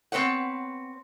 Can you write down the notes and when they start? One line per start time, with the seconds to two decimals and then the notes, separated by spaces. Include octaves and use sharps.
0.12 B3 C4 B4 C#5 F#5